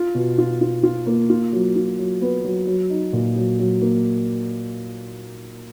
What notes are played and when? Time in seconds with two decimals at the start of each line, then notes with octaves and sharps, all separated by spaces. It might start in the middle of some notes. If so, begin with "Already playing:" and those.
Already playing: F4
0.15 B2
0.38 F4
0.61 F4
0.83 F4
1.07 A#3
1.30 F4
1.53 F#3
1.76 F4
1.99 F#3
2.21 B3
2.44 F#3
2.67 F#3
2.90 D#4
3.13 A#2
3.36 F#3
3.59 F#3
3.82 A#3